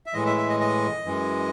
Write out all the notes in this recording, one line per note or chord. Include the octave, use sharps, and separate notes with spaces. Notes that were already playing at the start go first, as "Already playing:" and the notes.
E5
A2 E3 G#3 D#5
E5
E5
D#5
D#5
F#2 E3 G#3